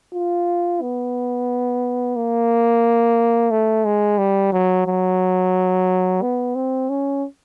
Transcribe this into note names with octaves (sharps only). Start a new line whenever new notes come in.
F4
B3
A#3
A3
G#3
G3
F#3
F#3
B3
C4
C#4